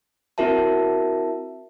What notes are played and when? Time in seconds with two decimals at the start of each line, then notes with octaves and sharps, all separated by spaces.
0.38 C4 E4 F#4 A#4 E5 A5